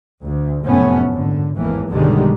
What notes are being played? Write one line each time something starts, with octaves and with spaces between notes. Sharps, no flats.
D2
F1 F#2 A2 A3 B3 C#4
G#1 D3
G#1 E2 A2 E3 A#3
B1 G2 D3 D#3 G3 G#3